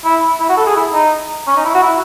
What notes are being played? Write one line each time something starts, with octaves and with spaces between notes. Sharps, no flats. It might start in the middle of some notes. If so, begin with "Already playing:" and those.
E4
E4
F#4
A4
G#4
E4
D#4
C#4
D#4
E4
F#4
E4